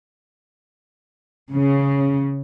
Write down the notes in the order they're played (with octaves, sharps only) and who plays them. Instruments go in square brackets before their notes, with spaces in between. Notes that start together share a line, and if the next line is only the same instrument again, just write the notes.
[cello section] C#3